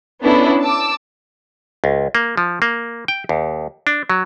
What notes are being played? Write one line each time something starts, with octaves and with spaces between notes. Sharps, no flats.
B3 C#4 D4 E4 A4
A5 D6 E6
C#2
A#3
F3
A#3
G5
D#2
D4
F#3